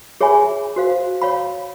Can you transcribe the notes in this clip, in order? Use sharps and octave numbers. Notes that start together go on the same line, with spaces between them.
G#4 C#5 E5 G#5 B5
F#4 C5 F5
C#5 F5 B5